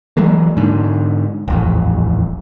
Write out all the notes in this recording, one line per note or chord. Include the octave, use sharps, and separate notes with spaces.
E3 F#3 G#3 A#3
G#2 D3
D#1 A1 F2